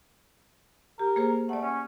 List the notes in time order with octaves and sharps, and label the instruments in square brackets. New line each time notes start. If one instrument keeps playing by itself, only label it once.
[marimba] G4 [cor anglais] A#4
[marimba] A#3 G#4 C5
[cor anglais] A3 [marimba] D5 F#5
[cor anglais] C#4